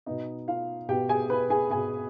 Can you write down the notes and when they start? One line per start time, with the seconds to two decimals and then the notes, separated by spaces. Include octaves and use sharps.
0.06 B2 B3 D#4 D#5
0.48 F4 F5
0.89 B2 B3 G4 G5
1.09 G#4 G#5
1.30 B4 B5
1.50 G#4 G#5
1.71 B2 B3 G#4 G#5